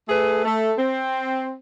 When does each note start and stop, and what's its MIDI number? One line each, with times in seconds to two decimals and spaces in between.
0.08 0.43 57
0.08 0.43 68
0.08 0.43 69
0.08 0.43 71
0.44 0.72 57
0.44 0.72 69
0.78 1.54 60